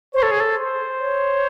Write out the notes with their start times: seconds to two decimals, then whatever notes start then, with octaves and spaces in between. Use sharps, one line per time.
0.14 C5 C#5
0.23 A4
0.31 G#4
0.40 A4
0.56 C5
0.99 C#5